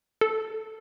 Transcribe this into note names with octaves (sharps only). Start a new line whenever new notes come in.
A4